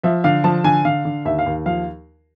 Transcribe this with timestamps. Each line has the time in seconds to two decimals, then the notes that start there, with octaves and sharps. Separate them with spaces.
0.03 F3 E5
0.24 D3 F5
0.44 F3 A5
0.64 D3 G#5
0.85 D3 F5
1.05 D3
1.25 D#2 E5
1.39 F5
1.46 D#2
1.66 F3 F5